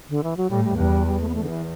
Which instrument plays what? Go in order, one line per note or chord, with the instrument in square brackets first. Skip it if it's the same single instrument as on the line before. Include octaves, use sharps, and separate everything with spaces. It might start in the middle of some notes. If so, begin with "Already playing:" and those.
[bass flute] D3
E3
F#3
[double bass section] A2 [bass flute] G3
[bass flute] G3
[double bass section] E2 [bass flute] G3
[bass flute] G3
A3
B3
[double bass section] E2 [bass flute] A3
[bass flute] D3
E3